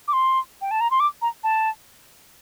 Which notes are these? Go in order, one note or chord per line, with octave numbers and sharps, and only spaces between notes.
D6
C6
G5
A5
A#5
C6
D6
A#5
A5